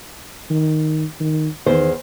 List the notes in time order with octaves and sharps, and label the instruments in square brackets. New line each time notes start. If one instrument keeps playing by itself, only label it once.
[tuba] D#3
D#3
[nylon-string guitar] E2 C5 [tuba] D#3